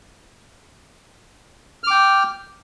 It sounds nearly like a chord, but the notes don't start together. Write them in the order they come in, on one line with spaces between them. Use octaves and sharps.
F6 D6 G5